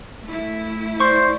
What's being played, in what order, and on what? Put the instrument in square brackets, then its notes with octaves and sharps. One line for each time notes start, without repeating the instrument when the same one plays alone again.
[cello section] A3 E4
[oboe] C5 [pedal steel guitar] D5 C6 C#6